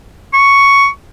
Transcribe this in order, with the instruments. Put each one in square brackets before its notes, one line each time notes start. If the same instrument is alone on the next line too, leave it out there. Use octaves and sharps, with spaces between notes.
[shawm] C#6